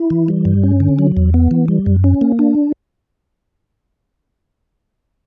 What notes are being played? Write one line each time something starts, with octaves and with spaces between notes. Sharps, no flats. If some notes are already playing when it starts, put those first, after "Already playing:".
Already playing: E4
E3
G3
G2
C#4
D3
F#3
E2
B3
E3
G3
F#2
C#4
A#3
D4